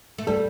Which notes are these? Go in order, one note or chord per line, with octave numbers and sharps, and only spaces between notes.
A3
G3 A4